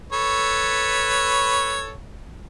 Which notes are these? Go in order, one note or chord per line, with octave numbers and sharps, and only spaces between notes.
A4 B4 C#5